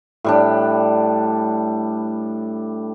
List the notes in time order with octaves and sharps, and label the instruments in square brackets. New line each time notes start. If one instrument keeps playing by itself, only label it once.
[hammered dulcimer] A2 G3 D4